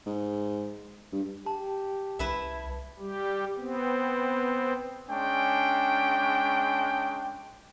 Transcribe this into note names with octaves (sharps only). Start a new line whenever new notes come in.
G#2
G2
G4 A5
C2 E4 B4 E5
G3 G4
B3 C4
G#3 C#4 D4 G5